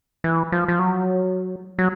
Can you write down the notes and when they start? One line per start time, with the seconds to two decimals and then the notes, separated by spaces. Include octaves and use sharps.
0.24 E3
0.52 F3
0.68 F3
0.79 F#3
1.78 F#3